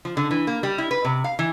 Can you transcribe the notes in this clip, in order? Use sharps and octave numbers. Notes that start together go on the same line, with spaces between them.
F3
D3
E3
A#3
G3
E4
B4
C3
F5
E3